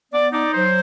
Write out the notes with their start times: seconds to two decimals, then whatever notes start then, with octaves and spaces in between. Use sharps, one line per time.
0.12 B3 D5
0.33 D#4 D5
0.54 F#3 C5